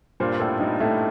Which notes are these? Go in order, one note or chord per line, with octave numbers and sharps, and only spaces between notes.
G2 A#2 C5
A2 A4
G2 D#4
A2 A3